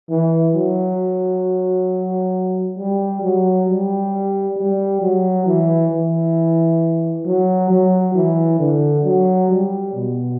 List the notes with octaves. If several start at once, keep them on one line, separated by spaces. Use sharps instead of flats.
E3
F#3
G3
F#3
G3
G3
F#3
E3
E3
F#3
F#3
E3
D3
F#3
G3
B2